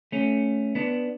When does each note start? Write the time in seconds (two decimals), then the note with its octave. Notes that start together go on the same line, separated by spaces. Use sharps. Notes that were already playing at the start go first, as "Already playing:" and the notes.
0.12 A3 C#4
0.75 B3 D4